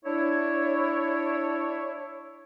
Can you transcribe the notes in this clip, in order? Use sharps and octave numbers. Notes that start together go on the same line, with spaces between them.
D4 E4 C#5